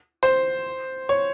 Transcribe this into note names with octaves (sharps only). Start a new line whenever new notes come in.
C5
C#5